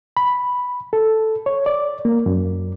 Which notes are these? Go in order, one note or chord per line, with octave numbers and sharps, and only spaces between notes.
B5
A4
C#5
D5
A#3
F#2